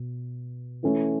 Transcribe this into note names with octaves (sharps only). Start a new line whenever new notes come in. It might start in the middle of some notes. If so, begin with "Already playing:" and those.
Already playing: B2
E3 A3 C#4 E4